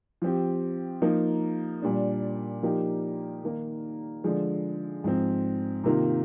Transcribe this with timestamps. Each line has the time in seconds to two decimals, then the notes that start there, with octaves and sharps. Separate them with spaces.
0.22 F3 C4 G4
1.02 F3 A#3 D#4
1.82 A#2 G3 D4
2.63 F3 A#3 D#4 G4
3.44 D#3 A#3 D#4
4.24 D3 F3 G#3
5.04 G#2 F3 C4
5.84 C3 D#3 A#3 F4